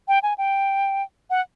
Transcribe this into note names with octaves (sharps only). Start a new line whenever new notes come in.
G5
G#5
G5
F#5